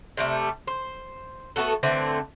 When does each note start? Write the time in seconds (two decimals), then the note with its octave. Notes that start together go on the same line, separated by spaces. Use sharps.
0.17 C3 G3 A3
0.67 C5
1.56 A3 B3 F#4 A4
1.83 D3 E3 A3 C4